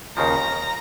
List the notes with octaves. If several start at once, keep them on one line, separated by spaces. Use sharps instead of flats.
D#2 C#3 F3 A#5